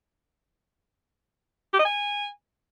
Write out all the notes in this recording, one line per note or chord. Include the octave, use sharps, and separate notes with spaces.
G4
D#5
G#5